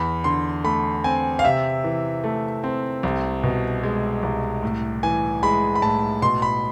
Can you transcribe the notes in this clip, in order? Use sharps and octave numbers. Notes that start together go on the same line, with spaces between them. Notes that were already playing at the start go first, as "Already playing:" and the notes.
Already playing: E2 B5
D3 C6
A3 B5
C4 G#5
F5
C3 E5
E3
A3
C4
C2
B2
G#3
C2
A2
E3 G#5
G#3 B5
B5
A2 A5
B2 C6
B5